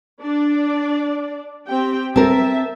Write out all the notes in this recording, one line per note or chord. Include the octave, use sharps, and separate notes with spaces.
D4 D5
C4 G4 G5
C4 A#4 E5 A5